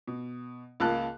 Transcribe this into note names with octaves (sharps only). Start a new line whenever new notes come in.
B2
C#2 A#3 F4 A5 F#6